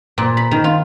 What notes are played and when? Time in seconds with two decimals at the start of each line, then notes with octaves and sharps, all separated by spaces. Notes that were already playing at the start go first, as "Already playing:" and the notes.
0.18 A#2
0.37 B5
0.51 D#3
0.64 F4